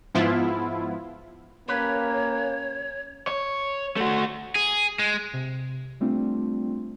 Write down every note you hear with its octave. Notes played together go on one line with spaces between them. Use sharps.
G#2 F3 B3 E4 F4
A#3 C#4 G4 B4 C#5
C#5
A3 F#4
G#4
G#3
C3
G3 A3 C4 D4 F4